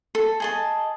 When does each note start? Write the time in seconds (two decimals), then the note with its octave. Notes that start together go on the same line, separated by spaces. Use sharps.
0.15 A4
0.40 G#4 D#5 A5